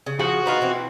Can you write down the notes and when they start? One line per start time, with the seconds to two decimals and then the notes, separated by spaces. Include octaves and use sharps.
0.06 C#3
0.19 C#3 F3 F#4 G#4
0.46 B3 D#4 F4
0.61 B2 E3 C4